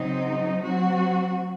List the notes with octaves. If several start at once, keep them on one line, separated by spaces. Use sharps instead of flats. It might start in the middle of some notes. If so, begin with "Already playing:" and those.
Already playing: C#3 F#3 C4 D#4
F#3 C4 F#4